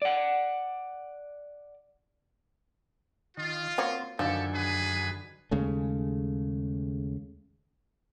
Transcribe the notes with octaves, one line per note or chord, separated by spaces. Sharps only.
D5 F#5
D#3 F4
A#3 C4 F#4 C#5
F#2 D3 D#3 F3 G4 A4 G#5
D4 G#4 B4
D#2 C#3 G#3 A3